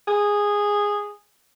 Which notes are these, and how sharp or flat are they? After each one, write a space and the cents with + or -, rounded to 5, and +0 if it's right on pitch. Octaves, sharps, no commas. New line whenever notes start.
G#4 -10